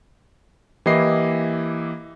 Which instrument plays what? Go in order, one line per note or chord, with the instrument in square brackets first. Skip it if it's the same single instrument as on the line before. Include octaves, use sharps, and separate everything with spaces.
[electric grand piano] E3 A#3 E4 G4 D#5 C7